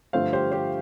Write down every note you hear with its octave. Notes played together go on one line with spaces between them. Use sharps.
G2 D3 F3 A3 C5 F5
G4 C5
G4 C5